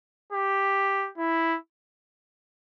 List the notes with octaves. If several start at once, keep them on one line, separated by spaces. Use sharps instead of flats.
G4
E4